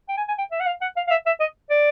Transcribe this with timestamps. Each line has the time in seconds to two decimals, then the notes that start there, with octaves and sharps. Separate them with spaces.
0.09 G5
0.17 G#5
0.28 G#5
0.38 G5
0.52 E5
0.60 F#5
0.67 F5
0.81 F#5
0.97 F5
1.08 F5
1.11 E5
1.26 E5
1.40 D#5
1.70 D5